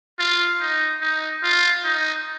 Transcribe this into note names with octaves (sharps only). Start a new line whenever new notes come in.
F4
D#4
D#4
F4
D#4